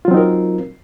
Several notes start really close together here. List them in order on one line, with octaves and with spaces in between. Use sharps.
F4 F#3 C4 D#4 A#4